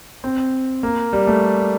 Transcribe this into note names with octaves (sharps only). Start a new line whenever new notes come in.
C4
A#3
G3
A3